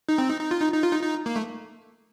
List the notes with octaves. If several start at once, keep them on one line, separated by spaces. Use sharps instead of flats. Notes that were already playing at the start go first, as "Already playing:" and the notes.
D#4
C4
D#4
D#4
F4
D#4
D#4
F4
D#4
D#4
A#3
A3